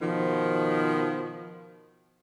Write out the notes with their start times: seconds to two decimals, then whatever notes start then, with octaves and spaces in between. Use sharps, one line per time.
0.01 B2 D#3 F3